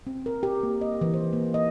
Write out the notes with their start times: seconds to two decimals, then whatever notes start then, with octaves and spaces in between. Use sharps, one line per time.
0.07 C4
0.26 A#4
0.43 G4
0.63 A#3
0.81 D#5
1.01 E3
1.14 C5
1.33 A#3
1.54 D#5